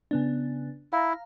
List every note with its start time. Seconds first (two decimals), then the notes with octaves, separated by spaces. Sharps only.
0.11 C#3 B3 D4
0.93 E4 F5 A#5